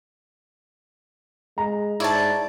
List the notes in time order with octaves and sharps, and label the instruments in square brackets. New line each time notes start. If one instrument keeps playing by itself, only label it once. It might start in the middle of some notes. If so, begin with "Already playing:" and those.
[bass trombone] G#3 [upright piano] A#5
[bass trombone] G#2 [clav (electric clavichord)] E4 C#5 [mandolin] D5 A5